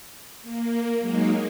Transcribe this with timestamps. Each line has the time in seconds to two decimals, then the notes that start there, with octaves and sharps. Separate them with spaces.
0.42 A#3
1.00 F#3 G#3 A#3 D#4